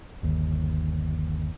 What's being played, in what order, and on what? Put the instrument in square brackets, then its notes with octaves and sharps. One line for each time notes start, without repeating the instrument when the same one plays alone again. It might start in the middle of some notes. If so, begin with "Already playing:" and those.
[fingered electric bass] G1 D#2